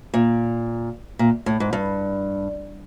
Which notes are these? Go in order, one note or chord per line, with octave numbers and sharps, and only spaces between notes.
A#2
A#2
A2
G#2
G2